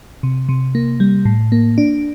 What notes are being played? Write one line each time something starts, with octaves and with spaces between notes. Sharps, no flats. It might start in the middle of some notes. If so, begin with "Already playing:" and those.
C3
C3
A#3
G3
A2
A#3
D4